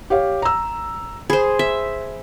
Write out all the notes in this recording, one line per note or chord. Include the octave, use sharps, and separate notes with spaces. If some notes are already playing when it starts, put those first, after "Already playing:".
G4 C#5 F5
A#5 E6
G#4 C5 B5
E5